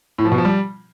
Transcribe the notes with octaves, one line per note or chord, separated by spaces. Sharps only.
A2
F3
B2
F3
G3